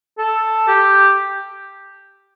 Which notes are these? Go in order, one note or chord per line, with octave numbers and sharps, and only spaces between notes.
A4
G4